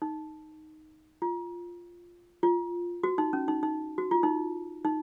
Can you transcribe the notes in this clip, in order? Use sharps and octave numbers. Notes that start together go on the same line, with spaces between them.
D#4
F4
F4
F#4
D#4
C#4
D#4
D#4
F#4
F4
D#4
D#4